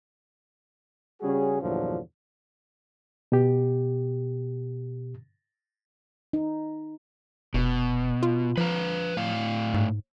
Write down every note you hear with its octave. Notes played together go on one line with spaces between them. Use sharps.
C#3 G3 C#4 F#4 G#4
E2 G2 A#2 D3 F3 F#3
B2 G4
D#4
F1 B2
F4
F3 B4 F5 A#5
A2 F5
G#2